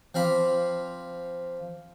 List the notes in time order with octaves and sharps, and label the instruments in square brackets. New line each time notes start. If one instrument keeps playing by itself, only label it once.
[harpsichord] F3 C4 F5 B5 D6